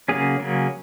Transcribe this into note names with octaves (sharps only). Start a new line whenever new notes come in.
C#3 F#3 A#3 C#4 G#4
C#3 F#3 A#3 C#4